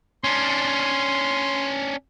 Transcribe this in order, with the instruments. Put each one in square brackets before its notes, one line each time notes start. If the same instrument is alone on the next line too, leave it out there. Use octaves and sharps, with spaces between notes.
[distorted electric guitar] C#4 D4 [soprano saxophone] C6